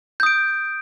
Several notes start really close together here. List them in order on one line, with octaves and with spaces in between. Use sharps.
G6 D#6 D7